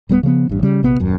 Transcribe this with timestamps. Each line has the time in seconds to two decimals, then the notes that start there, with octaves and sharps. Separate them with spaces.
0.09 D1 G3 G#3 B3
0.23 C#3 F3 G3 B3
0.49 A1 G2
0.63 C#3 G3
0.83 A#1 C3 B3
1.00 D#1 F#2